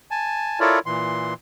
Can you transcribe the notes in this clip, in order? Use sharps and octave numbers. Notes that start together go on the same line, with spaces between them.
G#5 A5
E4 F4 A4 A#4 C#5 D5
A#2 E3 C6